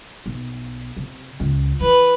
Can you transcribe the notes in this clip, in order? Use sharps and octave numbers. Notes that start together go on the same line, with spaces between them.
B1
C3
C#2
E3 B4